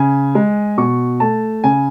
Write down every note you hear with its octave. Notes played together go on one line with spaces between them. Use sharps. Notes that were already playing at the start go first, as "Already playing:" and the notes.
Already playing: C#3 G#5
G#3
B2 C#6
A3 A5
C#3 G#5